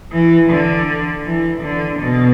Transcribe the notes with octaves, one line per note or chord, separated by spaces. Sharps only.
E3
D3
E3
D3
B2